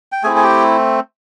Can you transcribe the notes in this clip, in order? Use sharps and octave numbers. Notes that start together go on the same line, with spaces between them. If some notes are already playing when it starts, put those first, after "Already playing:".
G5
A3 C4 E4 G#4 G#5
G#5
G4 G5